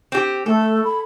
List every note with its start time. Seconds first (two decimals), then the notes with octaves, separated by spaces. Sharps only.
0.12 C4 G4
0.46 A3 A4
0.84 B5